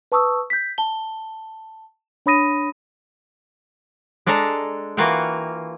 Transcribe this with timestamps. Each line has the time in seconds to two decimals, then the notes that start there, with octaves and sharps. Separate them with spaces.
0.12 B4 A5 C#6 D#6 E6
0.50 G6 B6
0.78 A5 G7
2.26 D4 C#5 B5 D#6 A#6 D#7
4.26 G#3 D4 A4 A5 A#5
4.97 E3 A#3 F4 F#4 F5 G5